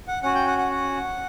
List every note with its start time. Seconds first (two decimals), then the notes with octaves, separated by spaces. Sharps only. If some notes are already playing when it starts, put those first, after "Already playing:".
0.08 F#5
0.23 C#4 F#4 F#5
0.35 G5
0.47 F#5
0.58 F#5
0.71 F#5